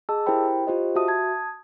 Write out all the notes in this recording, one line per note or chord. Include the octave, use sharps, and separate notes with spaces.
G#4 D#5 A5 E6
E4 G4 A#4 C5 G5 B5
F4 G4 C5 D#5
F#4 E5 A5 D#6
A5 D#6 G#6